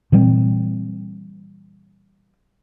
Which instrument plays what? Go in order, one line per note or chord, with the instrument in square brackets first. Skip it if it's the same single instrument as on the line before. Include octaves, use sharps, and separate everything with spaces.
[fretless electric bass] A#2 E3 G3 C4